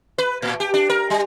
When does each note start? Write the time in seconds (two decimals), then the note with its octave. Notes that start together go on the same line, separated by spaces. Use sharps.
0.18 B4
0.42 A2
0.60 G4
0.74 D4
0.90 A#4
1.10 G3